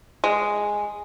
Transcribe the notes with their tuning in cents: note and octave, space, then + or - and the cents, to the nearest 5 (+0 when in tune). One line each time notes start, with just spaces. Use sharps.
G#3 -5